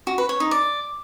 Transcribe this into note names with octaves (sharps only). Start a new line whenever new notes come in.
F#4
B4
C#5
D#4
D5